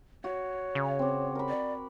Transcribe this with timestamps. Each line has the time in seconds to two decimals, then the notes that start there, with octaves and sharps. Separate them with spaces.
0.24 F#4 C#5
0.75 C#3
0.99 C4 D6
1.35 A#4 B5
1.49 D5